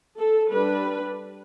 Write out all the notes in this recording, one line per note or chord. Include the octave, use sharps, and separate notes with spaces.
A4
G3 D4 B4